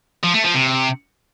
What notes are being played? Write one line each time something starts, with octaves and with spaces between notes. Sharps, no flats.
F3
A3
F3
C3